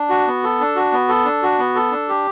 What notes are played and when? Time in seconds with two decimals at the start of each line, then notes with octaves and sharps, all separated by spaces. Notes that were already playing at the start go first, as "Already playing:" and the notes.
Already playing: D4
0.10 F#4
0.27 B3
0.44 A4
0.60 D4
0.76 F#4
0.93 B3
1.09 A4
1.25 D4
1.43 F#4
1.59 B3
1.75 A4
1.91 D4
2.09 G4